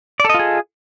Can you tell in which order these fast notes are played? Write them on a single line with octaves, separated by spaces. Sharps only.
D5 A4 D#5 F4 G#4